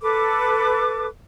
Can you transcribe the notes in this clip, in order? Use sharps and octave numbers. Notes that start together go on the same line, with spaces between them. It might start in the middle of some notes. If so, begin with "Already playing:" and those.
A4 B4 D6